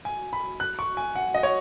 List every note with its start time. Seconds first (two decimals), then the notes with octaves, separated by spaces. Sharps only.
0.05 G#5
0.33 B5
0.60 F#6
0.79 C#6
0.97 G#5
1.15 F#5
1.34 D#5
1.43 C#5